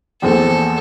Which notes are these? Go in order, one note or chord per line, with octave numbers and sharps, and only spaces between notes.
A#1 E2 C4 A4